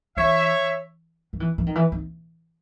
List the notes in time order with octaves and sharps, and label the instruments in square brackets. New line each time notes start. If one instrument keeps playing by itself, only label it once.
[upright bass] E3 [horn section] C#5 E5
[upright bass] F#3
E3
E3
D#3
E3
D#3